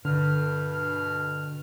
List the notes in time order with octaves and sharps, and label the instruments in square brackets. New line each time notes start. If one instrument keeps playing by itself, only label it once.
[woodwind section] G2 B2 F6 [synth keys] D3